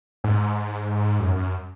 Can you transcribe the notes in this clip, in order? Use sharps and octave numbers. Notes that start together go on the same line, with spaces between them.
G#2
F#2
F#2